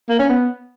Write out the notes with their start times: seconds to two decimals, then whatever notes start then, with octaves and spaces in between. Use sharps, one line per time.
0.09 A#3
0.19 C#4
0.29 B3